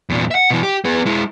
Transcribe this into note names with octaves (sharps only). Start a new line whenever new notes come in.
E2 A#2
E5 F#5
B2 E3
G4
B3 G#4
G#3 E4